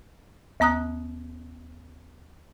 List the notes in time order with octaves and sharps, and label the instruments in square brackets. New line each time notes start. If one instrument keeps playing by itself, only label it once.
[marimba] D#2 B3 A#5 D#6 F#6